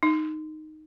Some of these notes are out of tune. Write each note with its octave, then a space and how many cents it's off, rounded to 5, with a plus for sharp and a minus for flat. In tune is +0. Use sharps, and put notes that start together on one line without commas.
D#4 -5